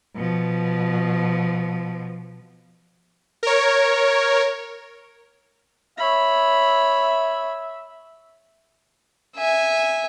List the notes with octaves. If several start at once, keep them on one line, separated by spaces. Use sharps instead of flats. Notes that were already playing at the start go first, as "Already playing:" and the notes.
B2 F3
A#4 C#5
C#5 E5 B5
E5 G#5